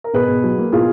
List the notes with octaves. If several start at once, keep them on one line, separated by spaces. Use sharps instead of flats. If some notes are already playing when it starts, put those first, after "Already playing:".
A#4
B2 G#4 B4
B2
F#3
A#3
B2 F4 G#4